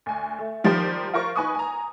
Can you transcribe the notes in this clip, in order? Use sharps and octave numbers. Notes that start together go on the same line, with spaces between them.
D2 G#5
A3
D#3 F3 G3 G4 A#4 C5
F4 A#4 C5 C#6
D#4 B4 G#5 C#6 D#6
G#5 A#5